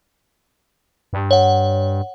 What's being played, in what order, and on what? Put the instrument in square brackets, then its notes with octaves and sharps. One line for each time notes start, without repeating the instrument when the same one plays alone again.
[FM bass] G2
[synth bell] C#5 F#5